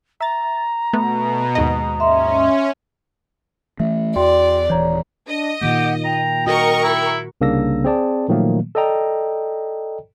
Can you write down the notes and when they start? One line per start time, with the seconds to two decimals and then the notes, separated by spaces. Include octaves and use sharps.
0.21 E5 A#5 A6
0.93 B2 A3 B3
1.55 D#2 G#2 D#5
2.00 C#4 E5 C6
3.80 E3 A3 E5
4.16 E2 F#4 D5 G5 C6
4.70 D#1 E3 C#5 D5 A#5
5.28 D4 D#5
5.62 A#2 D#3 A#3 G4 F#5
6.05 G5 A#5
6.47 F#4 A#4 D#5 C#6
6.84 E4
7.41 C2 C#3 A#3 D4 E6 A#6
7.84 C4 G#4 D5 A5
8.28 A#2 D#3 F3 F#3 A3 A#3
8.75 A4 D5 D#5 G5 A#5